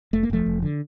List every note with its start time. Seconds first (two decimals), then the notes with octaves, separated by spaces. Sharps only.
0.13 F1 A3
0.23 A#3
0.30 F1 F3 A3
0.46 F1
0.63 D3